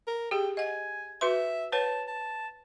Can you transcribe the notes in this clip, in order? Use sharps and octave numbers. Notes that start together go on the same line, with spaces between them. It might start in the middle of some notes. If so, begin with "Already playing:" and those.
A#4
G4 G#4 G5
D#5 F#5 G#5
F#4 B4 E5 C6
B4 C#5 F#5 A5
A5